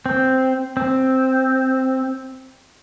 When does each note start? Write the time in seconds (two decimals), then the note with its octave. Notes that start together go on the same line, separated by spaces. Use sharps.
0.06 C4
0.77 C4